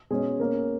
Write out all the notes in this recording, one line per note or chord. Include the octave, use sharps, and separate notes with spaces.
B2 G#3 C#4 G#4
B2 A#3 C#4 A#4